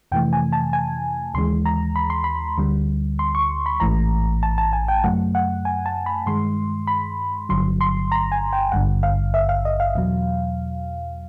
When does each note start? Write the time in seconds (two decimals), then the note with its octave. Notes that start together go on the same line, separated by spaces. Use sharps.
0.12 F2 C3 E3 A3 G5
0.33 G#5
0.53 A5
0.73 G#5
1.34 D#2 C#3 E3 G#3 C6
1.66 A#5
1.96 B5
2.10 C6
2.24 B5
2.58 D2 D3 G3
3.19 C6
3.35 C#6
3.66 B5
3.80 A1 G#2 E3 A3 A#5
4.43 A5
4.58 A5
4.73 G#5
4.88 G5
5.04 F#2 C#3 F#3 A3 F#5
5.35 F#5
5.65 G#5
5.86 A5
6.06 B5
6.26 G2 D#3 G#3 C6
6.87 B5
7.49 G1 G2 D3 F#3 C6
7.81 C6
8.12 A#5
8.32 G#5
8.53 G5
8.72 G#1 G2 D3 F#5
9.03 F5
9.34 E5
9.49 F5
9.65 D#5
9.80 F5
9.95 E2 B2 F#3